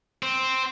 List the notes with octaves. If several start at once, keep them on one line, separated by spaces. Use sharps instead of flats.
C4